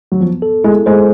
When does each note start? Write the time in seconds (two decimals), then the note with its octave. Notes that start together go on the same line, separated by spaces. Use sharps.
0.12 F#3
0.21 F3 B3
0.42 A4
0.64 G#3 E4
0.86 G#3 C5